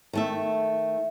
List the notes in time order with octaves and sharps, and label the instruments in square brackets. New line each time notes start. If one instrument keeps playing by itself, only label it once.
[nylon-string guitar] D#3 A3 E5